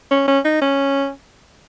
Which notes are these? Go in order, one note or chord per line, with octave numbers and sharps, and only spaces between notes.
C#4
C#4
D#4
C#4